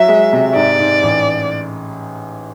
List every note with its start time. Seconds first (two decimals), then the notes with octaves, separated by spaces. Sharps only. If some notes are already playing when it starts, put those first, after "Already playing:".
Already playing: F#3 E5
0.08 G#3
0.33 C3
0.55 G#2 D5
0.79 G#2
1.03 A1